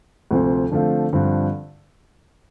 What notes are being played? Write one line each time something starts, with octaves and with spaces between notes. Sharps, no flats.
D2 C3 F3 C4
D3 F3 A3 C4 F4
G2 D3 F3 C4